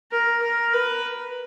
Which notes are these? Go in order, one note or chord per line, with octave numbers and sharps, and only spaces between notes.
A#4
A#4
B4